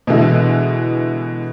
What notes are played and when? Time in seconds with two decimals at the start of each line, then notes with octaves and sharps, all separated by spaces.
0.07 B2 D3 E3 G#3